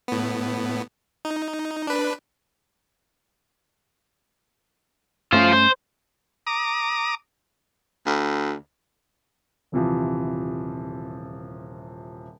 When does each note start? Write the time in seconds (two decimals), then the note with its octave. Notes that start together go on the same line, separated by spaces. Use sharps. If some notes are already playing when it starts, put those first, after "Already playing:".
0.08 A2 B3
1.25 D#4
1.87 D4 B4
5.32 G2 A3 C#4 F4 C5
5.53 C5
6.47 A#5 D6 D#6
8.06 D2
9.72 D#1 C3 E3 F3